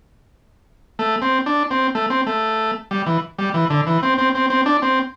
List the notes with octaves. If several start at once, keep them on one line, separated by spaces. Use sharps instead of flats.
A3
C4
D4
C4
A3
C4
A3
G3
E3
G3
E3
D3
E3
C4
C4
C4
C4
D4
C4